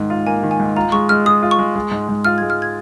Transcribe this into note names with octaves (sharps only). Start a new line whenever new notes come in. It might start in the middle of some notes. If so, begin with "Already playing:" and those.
Already playing: G#2 D#3
F4
A#3 G#5
D#3
G#5
G#2
F4 A#5
G#3 C#6
G#3 F6
G#4 D#6
F4
C#6
G#3
G#3
G#2
G#2
F4 F6
G#6
G#3
F6
G#6